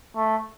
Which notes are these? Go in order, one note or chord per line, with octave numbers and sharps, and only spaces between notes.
A3